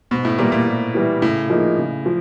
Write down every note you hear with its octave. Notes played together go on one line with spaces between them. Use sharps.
G#2 B2
A2
A#2 E3 G3 B3 E4
A#2
G#2
E3 G3 B3 E4
A2 C#3
F3 A#3 D#4 G#4
C#3
F3